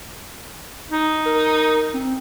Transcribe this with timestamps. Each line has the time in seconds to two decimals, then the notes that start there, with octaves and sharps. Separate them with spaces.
0.91 D#4
1.25 A#4
1.94 C4